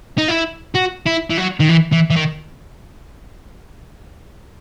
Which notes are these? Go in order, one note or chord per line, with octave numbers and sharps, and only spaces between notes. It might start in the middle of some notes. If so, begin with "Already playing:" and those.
D#4
E4
F#4
E4
E3
F#3
D#3
E3
E3
E3
D#3